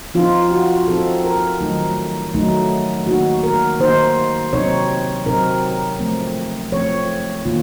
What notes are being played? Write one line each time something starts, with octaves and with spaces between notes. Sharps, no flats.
F3 C4 D#4 F4
F#4
F3 C4 D#4 A4
A#4
D#3 F#3 A3 D#4
D#3 F#3 A3 D#4
D#3 A#3 D#4 F#4
A#4
D#3 A#3 D#4 C5
C3 F#3 C4 D#4 C#5
C3 F#3 C4 D#4 A#4
F3 A3 C4
F3 A3 C4 C#5
D#3 A#3 F4